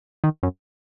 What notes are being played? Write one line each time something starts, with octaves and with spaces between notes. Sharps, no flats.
D#3
F#2